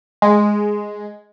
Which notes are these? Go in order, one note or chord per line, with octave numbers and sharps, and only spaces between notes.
G#3